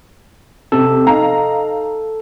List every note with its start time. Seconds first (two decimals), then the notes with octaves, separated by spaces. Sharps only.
0.72 C3 A4
1.07 D#4 F5 A#5